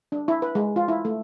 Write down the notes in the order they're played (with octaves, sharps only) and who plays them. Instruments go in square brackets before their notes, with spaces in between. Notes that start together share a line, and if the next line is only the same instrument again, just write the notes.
[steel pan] D4
E4
B4
G#3
F4
E4
A3